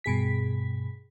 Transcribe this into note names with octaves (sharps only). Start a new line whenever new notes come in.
G2 B2 G#4 B6